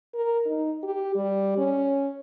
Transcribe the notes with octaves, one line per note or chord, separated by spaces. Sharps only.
A#4
D#4
G4
G3
C#4